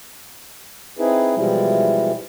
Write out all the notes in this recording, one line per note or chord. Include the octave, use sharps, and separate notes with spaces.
C4 D#4 E4 G#4 B4
B2 E3 F3 G3 G#3 E4